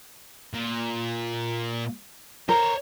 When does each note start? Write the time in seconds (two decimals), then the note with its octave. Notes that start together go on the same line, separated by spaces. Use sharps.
0.54 A#2
2.49 A#4 C5 C#5